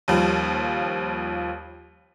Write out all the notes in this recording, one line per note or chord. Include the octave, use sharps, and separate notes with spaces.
D#2 F3 G3